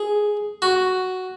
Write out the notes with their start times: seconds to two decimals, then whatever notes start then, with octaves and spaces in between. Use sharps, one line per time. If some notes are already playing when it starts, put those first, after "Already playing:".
Already playing: G#4
0.62 F#4